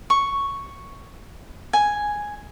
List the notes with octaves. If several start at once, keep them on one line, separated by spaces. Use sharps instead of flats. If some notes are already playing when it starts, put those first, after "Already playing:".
C#6
G#5